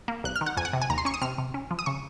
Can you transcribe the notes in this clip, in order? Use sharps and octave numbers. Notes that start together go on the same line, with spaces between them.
A#3
C2 F#6
F6
D#3
F#5
F2 G#5
F#5
C3
G#5
D#2 A#5
C6
C#4 C#6
D#6
C3 F6
C3
C#4
F3
D#6
C#3 C#6